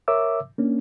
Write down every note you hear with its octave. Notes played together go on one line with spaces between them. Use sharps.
A#4 C#5 E5 D6 E6
A#3 C#4 D4